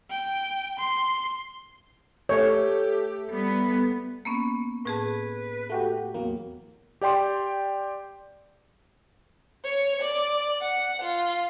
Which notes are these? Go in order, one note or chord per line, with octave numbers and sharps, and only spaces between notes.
G5
C6
A3 G4 C#5
G3 B3
A#3 B3 C#4
A2 G#4 B4 A5
A3 F#4 G4
E2 F#3 A#3
G4 D5 G5 C6
C#5
D5
F#5
F4